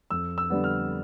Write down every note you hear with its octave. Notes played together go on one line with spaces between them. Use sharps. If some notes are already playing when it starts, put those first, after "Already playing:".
F2 E6
E6
D3 G3 B3
F6